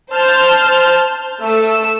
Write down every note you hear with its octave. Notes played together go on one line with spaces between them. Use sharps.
C5 A5 F6 G6
A3 E6